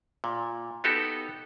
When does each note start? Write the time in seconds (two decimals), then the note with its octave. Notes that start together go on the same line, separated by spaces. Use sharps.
0.24 A#2
0.84 B3 D#4 F#4 G4 A4